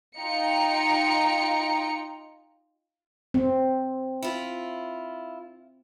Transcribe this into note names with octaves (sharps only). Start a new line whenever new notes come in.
D#4 F4 G5 A#5 C#7
C4
E4 F4